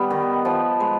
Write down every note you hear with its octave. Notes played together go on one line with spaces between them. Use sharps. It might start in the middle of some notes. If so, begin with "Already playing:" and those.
Already playing: G3 B3
D#3
F3
G#3